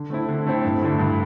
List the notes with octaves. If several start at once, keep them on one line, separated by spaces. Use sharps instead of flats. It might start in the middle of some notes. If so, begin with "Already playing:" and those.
Already playing: D3
A3 C4 E4
D3
A3 C4 E4
G2
D3 A3 E4
G2